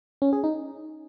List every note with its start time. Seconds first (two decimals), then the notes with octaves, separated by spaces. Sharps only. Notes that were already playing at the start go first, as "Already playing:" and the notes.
0.22 C#4
0.33 G#4
0.44 D#4